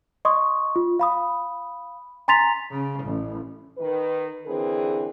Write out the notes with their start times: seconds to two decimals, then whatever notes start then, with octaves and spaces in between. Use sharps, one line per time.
0.25 D#5 C6 C#6 D#6
0.76 F4
0.99 F5 B5 D#6
2.28 G#5 A#5 C6 A6 B6 F7
2.71 C#3
3.04 A1
3.78 D#3 B4
4.46 D3 E3 C4 G#4 A#4 B4